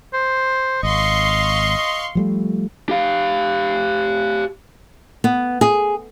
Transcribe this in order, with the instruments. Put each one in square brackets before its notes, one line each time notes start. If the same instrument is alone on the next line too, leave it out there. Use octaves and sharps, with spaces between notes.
[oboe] C5
[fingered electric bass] G#1 [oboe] D#5 [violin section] F5 C6 C#6
[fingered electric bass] F3 G3 A3
[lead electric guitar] G4 F5
[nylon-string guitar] B3
G#4